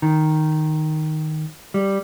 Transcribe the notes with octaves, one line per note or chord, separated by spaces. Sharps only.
D#3
G3